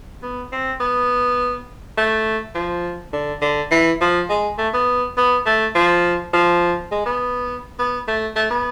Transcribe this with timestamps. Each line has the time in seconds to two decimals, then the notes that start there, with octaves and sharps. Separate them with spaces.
0.23 B3
0.52 C4
0.80 B3
1.97 A3
2.55 F3
3.13 D3
3.42 D3
3.71 E3
4.01 F3
4.29 G#3
4.58 A3
4.74 B3
5.17 B3
5.46 A3
5.75 F3
6.33 F3
6.91 G#3
7.06 B3
7.79 B3
8.08 A3
8.36 A3
8.50 B3